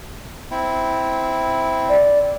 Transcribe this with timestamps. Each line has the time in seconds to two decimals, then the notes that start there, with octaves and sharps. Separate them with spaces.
0.51 C4 E4
1.89 D5